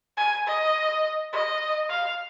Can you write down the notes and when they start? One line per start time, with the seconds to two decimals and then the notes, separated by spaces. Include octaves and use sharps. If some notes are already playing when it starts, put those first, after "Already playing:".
0.17 G#5
0.46 D#5
1.32 D#5
1.89 F5